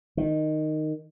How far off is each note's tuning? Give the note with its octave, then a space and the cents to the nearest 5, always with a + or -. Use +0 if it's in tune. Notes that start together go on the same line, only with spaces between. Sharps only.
D#3 -10